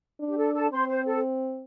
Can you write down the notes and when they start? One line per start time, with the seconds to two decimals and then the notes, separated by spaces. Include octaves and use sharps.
0.20 D4
0.28 G4
0.37 A4
0.54 A4 A5
0.71 C4 C5 C6
0.88 C5
1.07 A4